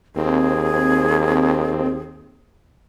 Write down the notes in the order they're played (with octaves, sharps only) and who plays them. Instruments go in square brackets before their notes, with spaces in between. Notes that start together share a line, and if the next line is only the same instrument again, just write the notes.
[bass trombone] D#2 [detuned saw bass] C4 [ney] G#4